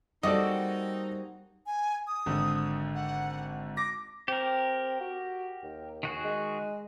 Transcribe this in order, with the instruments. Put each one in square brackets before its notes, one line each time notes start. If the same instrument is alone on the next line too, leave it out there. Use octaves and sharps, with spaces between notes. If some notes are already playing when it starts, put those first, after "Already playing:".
[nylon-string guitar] G3 [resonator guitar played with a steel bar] A#3 C4 F#4 [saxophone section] D#4 [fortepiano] A4 D5 D#5
[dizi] G#5
D#6
[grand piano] G#1 D3
[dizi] F#5
[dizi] D6 [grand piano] A#6
[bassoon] C4 [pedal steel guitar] G4 A#4
[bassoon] F#4
D#2
[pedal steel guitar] D#3 F#4 G#4
[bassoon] G#3